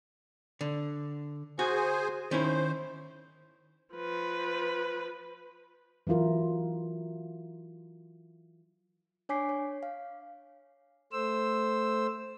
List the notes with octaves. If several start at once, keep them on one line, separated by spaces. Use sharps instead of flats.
D3
F#4 G#4 C5 G#5
D#3 C#4 E4 C5
F3 B4
E3 F#3 E4 F4 A#4
D4 C#5 G#5 D6 B6 C7
C#5
F5
A3 C5 E6